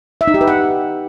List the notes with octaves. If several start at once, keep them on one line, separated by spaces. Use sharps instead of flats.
E5
D#4
G4
B4
F#5